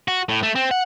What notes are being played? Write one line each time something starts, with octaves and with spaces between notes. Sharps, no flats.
F#4
A2
A3
C4
F#5